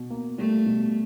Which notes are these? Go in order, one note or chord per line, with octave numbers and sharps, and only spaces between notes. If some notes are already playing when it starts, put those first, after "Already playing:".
Already playing: B2
A#3
G3 A3
B2